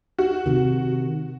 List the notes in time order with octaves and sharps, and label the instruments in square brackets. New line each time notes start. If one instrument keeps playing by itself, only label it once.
[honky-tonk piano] F#4
[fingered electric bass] C3 D#3